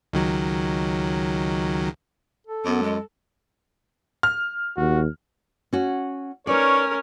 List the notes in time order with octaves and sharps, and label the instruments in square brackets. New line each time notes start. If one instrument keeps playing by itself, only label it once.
[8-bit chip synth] C#2 D#3 F#3
[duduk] A4
[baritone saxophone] F#2 [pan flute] B3
[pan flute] G#3
[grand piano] F6
[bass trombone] D#2 [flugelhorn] F#4
[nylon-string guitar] C#4 F#4
[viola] C#4 A#4 [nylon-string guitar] D#4 B4 D5 [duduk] C#5